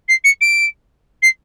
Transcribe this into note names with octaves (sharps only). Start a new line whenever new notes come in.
C7
C#7
D7
C7